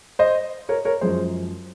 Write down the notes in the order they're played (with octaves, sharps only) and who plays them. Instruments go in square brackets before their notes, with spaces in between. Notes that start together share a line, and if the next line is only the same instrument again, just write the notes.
[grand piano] C5 D#5
A#4 C#5
A#4 C#5
F#2 F3 G#3 G#4 C5